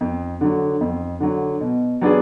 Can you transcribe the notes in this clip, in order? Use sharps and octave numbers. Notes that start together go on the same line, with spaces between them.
F2
D3 F#3
F2
D3 F#3
B2
F#3 B3 D4 G#4